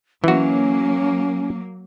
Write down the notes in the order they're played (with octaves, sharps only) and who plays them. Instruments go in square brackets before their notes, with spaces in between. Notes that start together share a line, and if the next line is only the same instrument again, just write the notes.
[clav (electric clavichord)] E3 F#4 [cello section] F#3 A#3 [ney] C#4